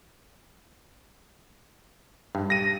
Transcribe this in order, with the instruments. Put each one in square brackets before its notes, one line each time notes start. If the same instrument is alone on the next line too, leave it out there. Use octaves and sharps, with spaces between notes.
[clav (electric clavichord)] G2
[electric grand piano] A#6 D#7